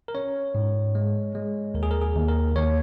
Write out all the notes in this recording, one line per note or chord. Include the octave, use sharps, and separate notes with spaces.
A#4
C#4 C#5
G#2
G#3
G#3
D#2 A#4
G#4
A#4
G#4
D#2
A#4
D#2 C#5